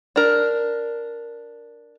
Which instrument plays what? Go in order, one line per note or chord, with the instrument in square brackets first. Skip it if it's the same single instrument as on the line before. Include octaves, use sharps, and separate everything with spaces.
[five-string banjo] D4 A#4